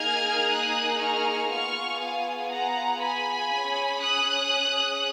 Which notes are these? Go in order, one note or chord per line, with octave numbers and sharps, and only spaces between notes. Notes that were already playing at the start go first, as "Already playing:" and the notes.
Already playing: A#3 D#4 G#4 F6 G#6
D#6 F#6
C#6 F6
B3 F4 G#4 C#6 F6
F5 G#5
F#5 A#5
G#5 B5
C#4 G#4
D#6 F#6